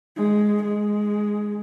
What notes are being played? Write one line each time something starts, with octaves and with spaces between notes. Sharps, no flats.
G#3
G#3